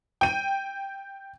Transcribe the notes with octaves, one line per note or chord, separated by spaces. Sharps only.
G5 D#7